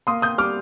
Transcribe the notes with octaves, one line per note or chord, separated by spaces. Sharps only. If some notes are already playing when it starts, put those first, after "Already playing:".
A#3 C6 D#6
D#6 G6
G3 D6 F6